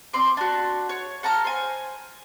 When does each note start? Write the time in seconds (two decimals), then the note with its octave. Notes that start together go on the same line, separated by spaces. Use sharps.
0.13 C4 D5 C6 D6
0.37 D4 F#4
0.89 C#5
1.23 F#5 A5 A#5 F6
1.45 C5 G#5